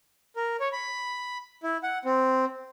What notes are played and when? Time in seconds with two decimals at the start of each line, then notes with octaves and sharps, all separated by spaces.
0.36 A#4
0.60 C#5
0.73 B5
1.63 E4
1.83 F#5
2.05 C4